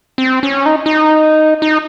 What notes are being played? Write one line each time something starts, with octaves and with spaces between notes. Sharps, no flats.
C4
C#4
D#4
D#4
D#4